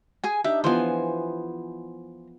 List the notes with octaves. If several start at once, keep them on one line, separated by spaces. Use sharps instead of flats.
G#4 G#5
D4 D#4 G4 E5
E3 F3 B3 C5 G#5